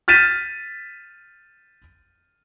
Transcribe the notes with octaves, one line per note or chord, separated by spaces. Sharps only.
F6 G6 A6 B6 D#7 E7